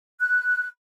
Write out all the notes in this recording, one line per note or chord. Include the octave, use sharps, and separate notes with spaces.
F#6